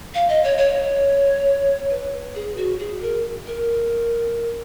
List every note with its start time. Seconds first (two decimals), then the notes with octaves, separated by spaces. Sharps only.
0.14 F5
0.29 D#5
0.44 C#5
0.58 C#5
1.91 B4
2.35 G#4
2.57 F#4
2.79 G#4
3.02 A#4
3.46 A#4